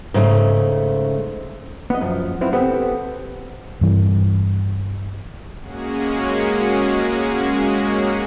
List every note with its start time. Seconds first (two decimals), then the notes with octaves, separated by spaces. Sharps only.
0.14 G#2 C#3 A3
1.90 B3 D#5
2.01 F#2 F3
2.41 B3 C4 E4 F4
2.53 B3 C4 G4 A4
3.81 G2 E3
5.61 G#3 A#3 C#4 F#4 G#4